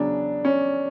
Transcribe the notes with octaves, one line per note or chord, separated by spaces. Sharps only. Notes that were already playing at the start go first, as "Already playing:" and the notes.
Already playing: E2 C#3 F#3 D4
C#4